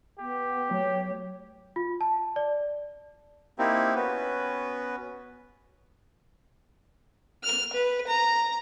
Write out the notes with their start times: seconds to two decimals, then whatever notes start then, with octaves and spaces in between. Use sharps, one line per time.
0.19 B3 G4
0.71 F#3 A3 C#5
1.76 F4
2.01 A5
2.36 D5
3.58 A#3 C4 D#4 E4 G4
3.95 B3 C#4 F#4 B4
7.44 F6
7.73 B4
8.07 A#5